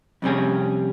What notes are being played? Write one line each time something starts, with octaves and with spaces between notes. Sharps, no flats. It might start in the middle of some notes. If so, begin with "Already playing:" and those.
F2 C3 G3 C#4 G#4